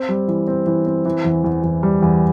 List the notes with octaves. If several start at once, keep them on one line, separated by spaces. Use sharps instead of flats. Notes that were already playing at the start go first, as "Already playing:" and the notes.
Already playing: C4
G3
E3
C4
E3
C4
E3
E2
E2
E2
G3
E2